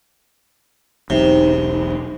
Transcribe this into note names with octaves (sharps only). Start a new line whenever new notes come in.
E1 B1 C3 D#4